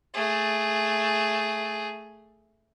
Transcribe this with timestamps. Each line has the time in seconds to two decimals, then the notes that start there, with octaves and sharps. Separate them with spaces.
0.14 A3 G#4